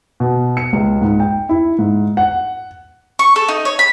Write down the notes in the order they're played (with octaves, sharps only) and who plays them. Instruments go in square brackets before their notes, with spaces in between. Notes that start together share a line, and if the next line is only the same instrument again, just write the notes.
[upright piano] B2
C#7
C#2
G#2
G5
E4
G#2
F#5
[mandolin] C#6
A4
D#4
C#5
B5